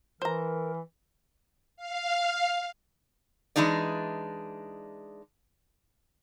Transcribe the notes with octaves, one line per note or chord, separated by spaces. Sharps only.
E3 A#4 C5 A#5
F5
E3 G#3 D4 D#4 D5